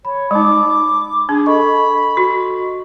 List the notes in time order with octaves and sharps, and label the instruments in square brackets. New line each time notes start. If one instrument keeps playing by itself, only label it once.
[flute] C#5 [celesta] B5
[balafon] G#3 D#4 [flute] D6
[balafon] D4 [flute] G#4
[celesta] A4 D#5 C#6 [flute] B5
[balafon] F#4